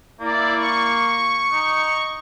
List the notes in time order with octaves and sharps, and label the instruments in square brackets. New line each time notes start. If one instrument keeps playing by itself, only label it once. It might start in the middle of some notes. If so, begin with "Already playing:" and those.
[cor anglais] A#3 [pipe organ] E4 D5
[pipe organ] C#6
[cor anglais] D#4